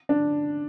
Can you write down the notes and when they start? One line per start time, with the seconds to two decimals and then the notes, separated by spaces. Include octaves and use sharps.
0.09 D4